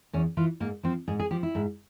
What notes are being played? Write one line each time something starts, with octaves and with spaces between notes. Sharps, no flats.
E2 C#4
E3 F4
G#2 A#3
F3 C4
G#2 G#4
G#4
F3 G4
E4
G#2